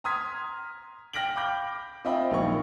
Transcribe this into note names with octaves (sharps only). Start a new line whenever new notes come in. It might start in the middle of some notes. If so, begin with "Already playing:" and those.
A#5 C6 D#6 F6 G#6 B6
G5 F6 A#6 B6 D7 F#7
F5 B5 D6 G6
C4 F4 D#5 E5 G5 B5
A#1 D#3 F#3 F5 C#6